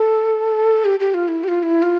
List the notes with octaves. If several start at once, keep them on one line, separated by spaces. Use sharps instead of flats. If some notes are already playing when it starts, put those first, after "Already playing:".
Already playing: A4
G4
G4
F4
E4
G4
F4
E4
F4